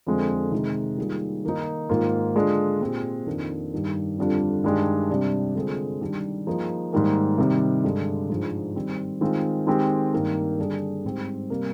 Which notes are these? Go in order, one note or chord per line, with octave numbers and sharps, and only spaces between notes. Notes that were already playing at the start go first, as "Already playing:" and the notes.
F2 D3 F3 G#3 C4
C3 D#3 G#3 D#4
D#3 G3 A#3 F4 G#4
D#3 A#3 D#4
G#2 D#3 A#3 F4
D3 G#3 D4 F4 G#4
A#2 G#3 C4 G4
F2 D#3 A#3 D4
G2 D#3 G3
F2 D3 G3 D4 F4
G2 D#3 G#3 D4 G4
C3 G3 D4 G4
D3 G#3 C4 F4 G#4
D#3 G3 D4 G4
F3 A#3 D#4 G#4
G#2 D#3 G3 A#3
C3 D#3 G3
G2 D3 G#3
G#2 F3 G#3 D4 G#4
D#3 G3 C4
D#3 G#3 C4 F4
D#3 G#3 C4 G4
G2 D#3 A#3
D3 G3 D4 G#4
G#2 G3 C4 G4
C3 G3 A#3